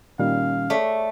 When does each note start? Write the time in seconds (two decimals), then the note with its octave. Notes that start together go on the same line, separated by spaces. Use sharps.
0.19 A#2 D#3 G3 C#4 F5
0.70 A3 C#5 D5 E5